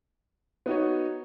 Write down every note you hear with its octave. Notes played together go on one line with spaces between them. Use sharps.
B3 D#4 F#4 C#5